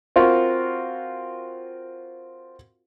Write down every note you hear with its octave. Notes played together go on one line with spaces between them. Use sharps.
C4 F4 F#4 A#4